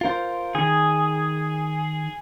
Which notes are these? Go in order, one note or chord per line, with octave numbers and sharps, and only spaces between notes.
F4 A#4 C5
D#3 G#4